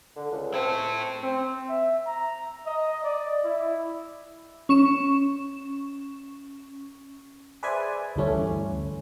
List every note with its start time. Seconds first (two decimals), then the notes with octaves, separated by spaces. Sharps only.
0.16 D3
0.31 C#2
0.54 C4 E4 A4
1.23 C4
1.69 E5
2.07 A#5
2.66 D#5
3.04 D5
3.45 E4
4.69 C#4 C#6 E7
7.63 G#4 B4 C5 D5 E5 G#5
8.16 D2 G2 E3 A3 C#4